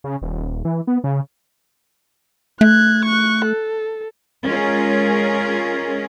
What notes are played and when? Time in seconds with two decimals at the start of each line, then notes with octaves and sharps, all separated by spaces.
0.04 C#3
0.22 D#1
0.65 E3
0.87 B3
1.04 C#3
2.61 A3 F#6 G#6
3.05 C#6 F#6
3.45 A4
4.45 G#3 C#4 F4 G#4 A#4